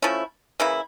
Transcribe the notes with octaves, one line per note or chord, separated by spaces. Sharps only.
F3 A3 C#4 E4
C#3 E3 A#3 E4